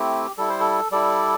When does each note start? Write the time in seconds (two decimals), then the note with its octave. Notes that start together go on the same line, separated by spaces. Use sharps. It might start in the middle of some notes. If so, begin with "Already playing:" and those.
Already playing: A3 C4 E4 G4
0.37 G3 E4 A4
0.49 C5
0.60 A4
0.91 G3 E4 A4 D5